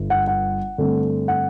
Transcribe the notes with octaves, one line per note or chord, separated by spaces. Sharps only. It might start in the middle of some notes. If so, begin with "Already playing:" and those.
Already playing: G1 G2 D3
F#5
F#5
G2 D3 A3 C4
F#5